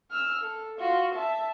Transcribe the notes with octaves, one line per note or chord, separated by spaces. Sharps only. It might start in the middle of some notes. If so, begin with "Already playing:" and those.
E6 F6
A4
F4 F#4
E5 A5